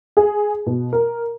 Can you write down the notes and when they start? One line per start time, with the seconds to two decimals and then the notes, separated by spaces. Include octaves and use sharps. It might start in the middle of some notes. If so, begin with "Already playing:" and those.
0.17 G#4
0.66 B2
0.93 A#4